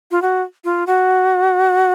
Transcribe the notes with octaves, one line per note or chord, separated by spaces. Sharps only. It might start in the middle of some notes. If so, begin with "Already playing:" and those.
F4
F#4
F4
F#4